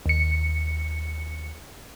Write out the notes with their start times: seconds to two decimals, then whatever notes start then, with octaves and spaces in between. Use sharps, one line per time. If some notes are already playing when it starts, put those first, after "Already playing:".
0.06 D#2 C#7